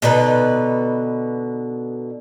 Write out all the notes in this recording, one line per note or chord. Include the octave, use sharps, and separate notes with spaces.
B2 D3 D#4 B4